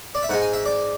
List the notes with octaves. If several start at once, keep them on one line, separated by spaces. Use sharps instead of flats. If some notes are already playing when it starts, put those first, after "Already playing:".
D5
E5
G#2 G#3 F#5
G#5
E5
D5